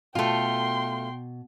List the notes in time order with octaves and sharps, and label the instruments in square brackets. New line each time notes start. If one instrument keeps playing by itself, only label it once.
[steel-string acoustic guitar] B2 [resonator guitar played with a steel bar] A3 F4 [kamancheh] G5 C6